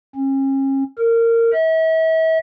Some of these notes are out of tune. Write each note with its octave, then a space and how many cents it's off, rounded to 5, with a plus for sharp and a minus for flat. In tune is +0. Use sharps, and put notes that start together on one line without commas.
C#4 -40
A#4 -20
E5 -40